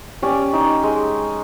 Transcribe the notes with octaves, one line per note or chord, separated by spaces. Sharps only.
C#4 G4 D5
D#4
G#3